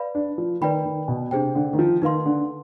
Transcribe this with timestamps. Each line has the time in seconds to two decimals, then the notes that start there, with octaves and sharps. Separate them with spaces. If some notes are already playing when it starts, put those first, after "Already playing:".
Already playing: B4 D5 F5 B5
0.15 D4
0.38 F3
0.61 D#3 B4 D5 G5 B5
0.85 D#3
1.08 B2
1.31 C3 D4 G#4 C5 G5
1.55 D3
1.73 D#3
1.79 F3
2.02 D#3 D#4 B4 F5 C6
2.26 D3